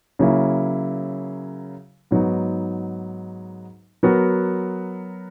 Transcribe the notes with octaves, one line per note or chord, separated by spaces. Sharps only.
C#3 F#3 A#3 E4
G#2 F#3 B3 D#4
F#3 B3 F#4 A#4